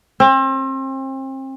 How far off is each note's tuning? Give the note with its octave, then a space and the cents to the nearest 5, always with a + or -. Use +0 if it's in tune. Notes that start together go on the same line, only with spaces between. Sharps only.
C4 +35